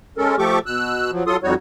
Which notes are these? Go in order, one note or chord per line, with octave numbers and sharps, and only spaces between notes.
G#3 C#4 A4 A#4
F3 A3 G4 A4 C#6 D6
B2 E6 F#6
F3 F#3
F#3 F4 A4 C6 D#6
F2 G3 D#4 F#4 C#5